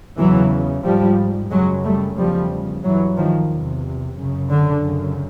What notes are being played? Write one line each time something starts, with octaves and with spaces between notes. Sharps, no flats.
E2 C#3 E3 F#3
G#2 F3 G3
F#2 C#3 F#3 G#3
G3 A3
E2 C#3 F3 G3
G2 E3 F#3
D#3 F3
E2 C3
F#2
C#3
D3
F#2 C#3